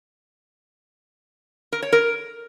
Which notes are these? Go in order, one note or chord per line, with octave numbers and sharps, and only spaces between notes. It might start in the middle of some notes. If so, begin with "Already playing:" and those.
A#4
C#5
A#4